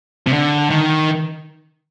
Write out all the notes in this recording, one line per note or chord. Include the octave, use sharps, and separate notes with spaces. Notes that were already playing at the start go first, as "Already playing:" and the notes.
C3
D3
D#3